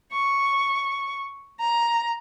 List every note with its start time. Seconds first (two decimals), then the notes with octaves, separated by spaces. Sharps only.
0.13 C#6
1.60 A#5